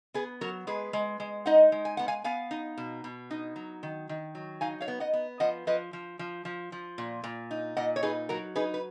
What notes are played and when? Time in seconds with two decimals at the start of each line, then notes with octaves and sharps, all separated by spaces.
0.14 B3 G#4 B4
0.41 F#3 F#4 A#4
0.67 G#3 G#4 B4
0.93 G#3
1.20 G#3
1.46 D#4 D#5 F#5
1.72 G#3
1.85 G#5
1.97 B3 F#5
2.08 F5 G#5
2.24 B3 F5 G#5
2.51 D#4
2.78 B2
3.04 B2
3.31 D#4
3.56 F#3
3.83 D#3
4.09 D#3
4.35 F#3
4.61 D#4 F5 G#5
4.81 C#5 F5
4.88 B3
5.00 D#5 F#5
5.13 B3
5.40 F3 D#5 F#5
5.67 F3 B4 D#5
5.93 F3
6.19 F3
6.45 F3
6.72 F3
6.98 A#2
7.24 A#2
7.51 D#4
7.77 A#2 D#5 F#5
7.96 C#5
8.03 D#4 G#4 B4
8.29 F#3 F#4 A#4
8.55 D#4 G#4 B4
8.74 B4